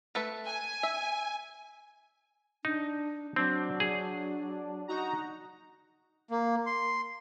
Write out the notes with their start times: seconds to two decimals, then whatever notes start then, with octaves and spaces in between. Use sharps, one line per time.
0.15 A3 A4 B4
0.46 G#5
0.83 E5
2.65 D4 D#4
3.36 F#3 C4 D4
3.80 G#4
4.88 D#4 F#4 A#5
6.31 A#3
6.66 C6